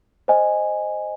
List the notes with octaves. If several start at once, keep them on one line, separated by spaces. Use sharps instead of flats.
C5 D#5 G#5